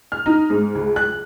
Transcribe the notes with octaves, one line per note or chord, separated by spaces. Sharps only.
F6
D#4
G#2
C#2
F#6